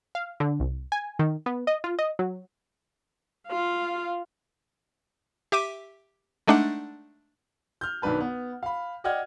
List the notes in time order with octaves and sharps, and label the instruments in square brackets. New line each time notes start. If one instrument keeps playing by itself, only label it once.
[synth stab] F5
D3
C2
G#5
D#3
B3
D#5
F4
D#5
F#3
[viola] F4 F5
[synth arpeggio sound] G4 E5 D6 D#7
G#3 A3 D4 D#4 F#5
[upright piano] F6 G6
B1 D#3 D4 B4 A5
B3
F5 B5
D5 D#5 F#5 G5 F6 G#6